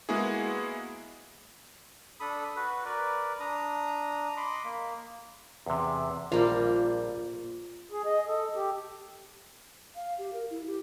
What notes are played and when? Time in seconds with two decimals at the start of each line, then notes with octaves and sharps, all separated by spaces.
0.09 G#3 A#3 B3 E4 F#4 G#4
2.20 D4 A4 B5 D#6
2.56 F#4 B4
2.85 A#4 B4 D5
3.40 D4 A#5 D#6
4.37 D#5 B5 C6 D6
4.64 A#3
5.66 E2 C3
6.32 A#1 G3 A#3 F4
7.91 G#4
8.05 D#5
8.27 A4
8.55 G4
9.95 F5
10.18 G4
10.33 A#4
10.50 E4
10.67 G4